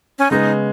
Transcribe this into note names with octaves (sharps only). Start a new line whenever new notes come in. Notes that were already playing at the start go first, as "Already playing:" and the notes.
C#4
C#3 G#3 B3 D#4